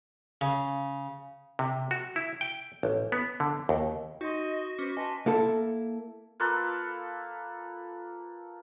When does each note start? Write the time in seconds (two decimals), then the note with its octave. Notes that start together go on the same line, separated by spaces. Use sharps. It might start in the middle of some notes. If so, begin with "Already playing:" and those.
0.41 C#3
1.59 C3
1.91 F#4
2.16 E4
2.41 G5
2.83 A1
3.12 B3
3.40 D3
3.69 D#2
4.21 D#4 F#4 D#5 C6
4.78 C#4 B4 C5 D6 C#7
4.97 B4 D#5 G#5 A5 C6 A#6
5.26 A#3 E4 A4
6.40 A#3 F4 A4 B4